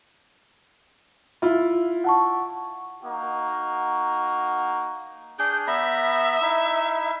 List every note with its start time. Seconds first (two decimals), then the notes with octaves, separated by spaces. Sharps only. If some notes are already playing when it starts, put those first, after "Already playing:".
1.42 E4 F4
2.04 F#5 A5 C#6
3.03 A#3 D#4 F#4
5.39 D4 G#4 G6
5.67 B3 E5 A#5 B5
6.42 D#4 E4